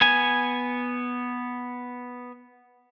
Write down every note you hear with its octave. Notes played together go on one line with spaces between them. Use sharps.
B3 G#5